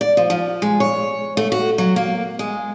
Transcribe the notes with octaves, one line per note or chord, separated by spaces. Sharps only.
D5
F3
F3
G#3
C#5
A3
F#4
F#3
A#3
G#3